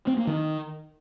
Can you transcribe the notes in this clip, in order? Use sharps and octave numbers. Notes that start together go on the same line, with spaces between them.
C4
A#3
D#3